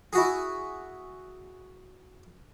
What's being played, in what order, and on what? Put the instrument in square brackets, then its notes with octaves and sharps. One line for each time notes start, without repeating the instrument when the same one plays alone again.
[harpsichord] E4 F#4 G#4